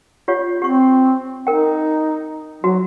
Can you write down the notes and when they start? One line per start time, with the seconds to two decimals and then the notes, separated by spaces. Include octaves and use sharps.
0.28 F4 G4 C#5
0.62 C4 G4 C#6
1.47 D#4 A#4 G5
2.64 F#3 F#4